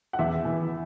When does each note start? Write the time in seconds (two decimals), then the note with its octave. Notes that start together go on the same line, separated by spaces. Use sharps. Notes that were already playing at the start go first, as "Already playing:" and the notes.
0.13 F#5
0.19 E2 E5
0.45 E3